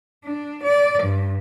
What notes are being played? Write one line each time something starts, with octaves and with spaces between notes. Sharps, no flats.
D4
D5
G2